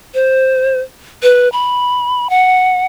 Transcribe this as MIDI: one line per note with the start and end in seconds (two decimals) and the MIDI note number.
0.14 0.80 72
1.23 1.49 71
1.52 2.28 83
2.30 2.86 78